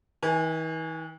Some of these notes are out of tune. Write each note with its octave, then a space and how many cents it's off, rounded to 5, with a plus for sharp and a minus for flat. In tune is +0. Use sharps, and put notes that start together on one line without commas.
E3 -45 G#5 +0